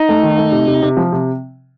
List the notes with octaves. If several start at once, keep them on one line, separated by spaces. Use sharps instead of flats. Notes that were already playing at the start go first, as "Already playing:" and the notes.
Already playing: D#4
A3
D#3
A3
C3
C3
C3
F3
C3